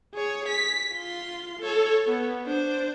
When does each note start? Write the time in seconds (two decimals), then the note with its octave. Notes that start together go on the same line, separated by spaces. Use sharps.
0.15 G#4 C#5
0.49 B6
0.93 F4 C6
1.60 A4 C#5
2.07 B3
2.46 D4 C5